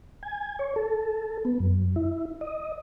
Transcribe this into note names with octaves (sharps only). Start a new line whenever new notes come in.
G#5
C#5
A4
B3
F#2
E4
D#5